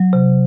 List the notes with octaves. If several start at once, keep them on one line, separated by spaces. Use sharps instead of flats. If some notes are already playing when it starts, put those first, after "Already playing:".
Already playing: F#3
C3